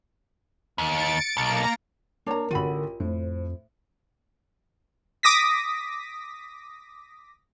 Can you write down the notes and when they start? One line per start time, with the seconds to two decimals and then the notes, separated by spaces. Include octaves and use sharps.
0.78 D#2 A6 C#7 D7
1.37 B1 A#3 A#5
2.27 A#3 D4 A#4 C#5 A#5
2.51 A1 D3 F4 F#4 B5 D#7
3.00 F2 A2 C5
5.23 D6 D#6 A#6 B6